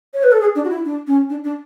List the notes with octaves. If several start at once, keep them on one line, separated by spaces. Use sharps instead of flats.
C#5
B4
A4
G#4
D4
F#4
E4
D4
C#4
D4
D4